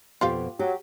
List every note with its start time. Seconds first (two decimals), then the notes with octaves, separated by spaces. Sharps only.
0.21 F2 B2 F4 G4 F5
0.59 F#3 G4